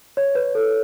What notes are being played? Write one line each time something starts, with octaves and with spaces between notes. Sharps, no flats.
C#5
B4
A4